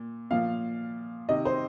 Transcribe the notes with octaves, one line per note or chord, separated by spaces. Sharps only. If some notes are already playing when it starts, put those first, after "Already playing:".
Already playing: A#2
A#2 F3 F5
C3 D#3 D#5
C5